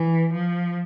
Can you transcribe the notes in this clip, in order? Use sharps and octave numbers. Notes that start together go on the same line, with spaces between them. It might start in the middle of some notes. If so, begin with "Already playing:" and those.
Already playing: E3
F3